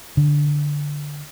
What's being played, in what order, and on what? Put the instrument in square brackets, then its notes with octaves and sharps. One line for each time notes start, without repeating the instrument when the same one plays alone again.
[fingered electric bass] D3